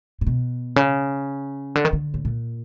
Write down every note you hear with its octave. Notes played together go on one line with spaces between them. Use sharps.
A#2
B2
C#3
D3
D#3
D3
A2
A#2